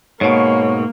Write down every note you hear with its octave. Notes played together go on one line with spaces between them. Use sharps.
G#2 B2 A#3 C#5